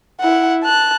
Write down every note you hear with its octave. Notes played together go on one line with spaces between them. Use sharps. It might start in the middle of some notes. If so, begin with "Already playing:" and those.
E4 F#5
A5 F#6